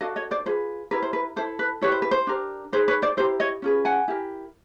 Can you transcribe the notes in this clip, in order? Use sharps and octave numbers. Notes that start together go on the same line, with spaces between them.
D4 F#4 A4 D#5 F5
C#5 D#5
C5 D5
F4 G#4 B4 C5
E4 G4 A#4 B4
C5
B4
E4 A4 C5
B4
E4 G4 B4 C#5
C5
B4
C5
D4 G4 A#4
D#4 G#4 B4 C5
B4 C#5
C5 D5
E4 G4 A#4 C5
C#5 D#5
C#4 F4 G#4 B4
F#5 G#5
E4 G4 A#4